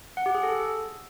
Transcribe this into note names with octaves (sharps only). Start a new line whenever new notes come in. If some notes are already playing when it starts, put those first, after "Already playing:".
F#5
G4
G#4
A4